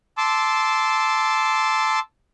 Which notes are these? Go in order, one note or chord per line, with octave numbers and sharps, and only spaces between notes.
A5 C6 D6 E6